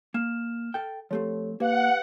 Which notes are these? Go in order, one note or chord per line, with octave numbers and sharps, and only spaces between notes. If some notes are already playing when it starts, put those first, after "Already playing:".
A#3 F6 E7
A4 G5
F3 A3 C4 G4 A4 C#5
A#3 G4 B4 F5 F#5